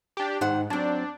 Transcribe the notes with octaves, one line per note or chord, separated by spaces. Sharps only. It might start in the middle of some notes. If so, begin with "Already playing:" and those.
D4 G4
G#2 D#3 C5 F#5
F#3 C4 D4